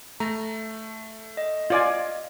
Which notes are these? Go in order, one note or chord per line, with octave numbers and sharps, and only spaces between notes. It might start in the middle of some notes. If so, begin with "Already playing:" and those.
A3 A#5
D#5
F4 D5 G#5